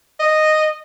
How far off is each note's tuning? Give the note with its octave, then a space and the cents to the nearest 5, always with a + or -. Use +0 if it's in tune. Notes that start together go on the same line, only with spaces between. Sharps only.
D#5 -5